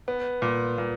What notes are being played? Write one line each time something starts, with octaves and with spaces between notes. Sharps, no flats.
B3
A#2
A#2